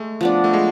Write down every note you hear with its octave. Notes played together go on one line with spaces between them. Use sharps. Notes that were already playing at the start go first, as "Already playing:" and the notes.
Already playing: G#3 A3
F3 B3 D4
A3
G#3